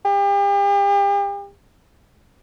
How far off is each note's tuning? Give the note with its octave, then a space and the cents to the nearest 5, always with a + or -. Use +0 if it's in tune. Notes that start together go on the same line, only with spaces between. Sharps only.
G4 +40